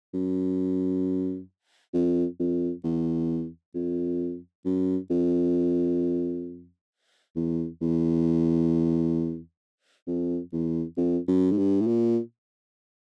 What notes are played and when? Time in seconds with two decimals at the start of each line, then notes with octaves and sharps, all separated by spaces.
0.14 F#2
1.94 F2
2.39 F2
2.84 E2
3.75 F2
4.65 F#2
5.10 F2
7.36 E2
7.81 E2
10.07 F2
10.52 E2
10.97 F2
11.28 F#2
11.52 G#2
11.58 G2
11.81 A2
11.87 A#2